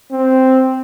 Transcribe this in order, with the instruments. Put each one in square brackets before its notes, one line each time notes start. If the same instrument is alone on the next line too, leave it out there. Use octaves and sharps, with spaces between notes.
[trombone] C4